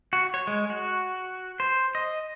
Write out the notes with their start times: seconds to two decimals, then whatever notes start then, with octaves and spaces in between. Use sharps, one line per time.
0.13 F#4
0.34 C#5
0.47 G#3
0.70 F#4
1.60 C5
1.95 D#5